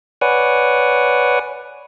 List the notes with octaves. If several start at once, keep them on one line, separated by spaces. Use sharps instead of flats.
B4 C#5 D5 F#5 G#5